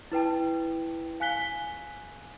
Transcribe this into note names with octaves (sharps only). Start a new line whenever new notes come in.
E4 B4 G5 A5
F5 G#5 F#6 B6 G7